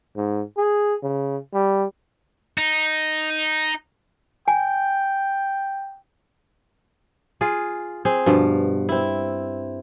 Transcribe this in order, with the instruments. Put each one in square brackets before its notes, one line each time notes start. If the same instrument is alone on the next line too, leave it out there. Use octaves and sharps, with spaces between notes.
[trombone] G#2
G#4
C#3
G3
[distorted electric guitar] D#4
[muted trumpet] G5 [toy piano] G#5
[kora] F4 G#4
C4 G#4
G2 B2 F3
C4 E4